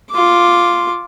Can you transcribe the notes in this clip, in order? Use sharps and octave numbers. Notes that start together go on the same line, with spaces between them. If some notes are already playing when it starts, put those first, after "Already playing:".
F4 D6